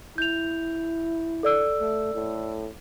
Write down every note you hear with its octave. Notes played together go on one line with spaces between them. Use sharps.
E4 G6 F7
A4 D5 E6
A3
A2